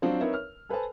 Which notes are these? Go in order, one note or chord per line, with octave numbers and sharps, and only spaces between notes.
F#3 C4 D4 F4 C5
C4 D#4 A#4 B4 C#5 E5
F6
A4 B4 C5 G#5 A5